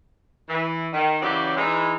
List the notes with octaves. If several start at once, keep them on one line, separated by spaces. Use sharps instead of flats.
E3
D#3
C#3 E3 F#3 G4 D5 E5
E3 G#3 D#4